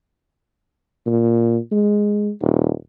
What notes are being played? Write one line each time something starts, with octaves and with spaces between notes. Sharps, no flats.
A#2
G#3
D#1